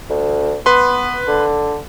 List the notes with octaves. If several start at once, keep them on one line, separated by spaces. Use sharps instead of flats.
D2
B3 B4 C6
D3